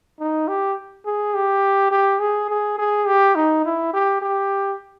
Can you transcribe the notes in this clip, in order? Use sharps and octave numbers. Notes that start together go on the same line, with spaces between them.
D#4
G4
G#4
G4
G4
G#4
G#4
G#4
G4
D#4
E4
G4
G4